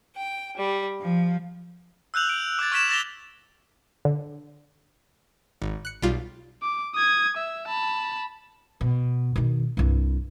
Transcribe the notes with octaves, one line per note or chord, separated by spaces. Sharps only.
G5
G3
F3
E6 F#6 G6 F7 F#7
D7
D6 E6 G#6 A6
C#6 F6 G#6 B6 E7 F7
D6 A6 A#6 F7 G7
D3
G#1
F#6 C#7
B1 G3 F4
D6
D#6 G#6
E5
A5 B5
B2
B2 D#3
C2 G2